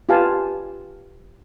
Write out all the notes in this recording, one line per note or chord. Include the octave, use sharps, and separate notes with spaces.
F4 G4 B4 F5 G#5 A5